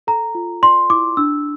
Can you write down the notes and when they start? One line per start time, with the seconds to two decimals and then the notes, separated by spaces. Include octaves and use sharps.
0.07 A4 A#5
0.35 F4
0.62 D5 C6
0.90 E4 D6
1.17 D4 E6